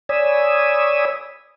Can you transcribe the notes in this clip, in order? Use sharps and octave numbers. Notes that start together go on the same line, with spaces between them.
C#5 D5 G#5 B5 D#6 E6